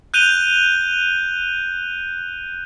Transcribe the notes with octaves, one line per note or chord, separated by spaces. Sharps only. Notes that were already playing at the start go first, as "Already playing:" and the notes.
F#6 G6 D#7 F7 G7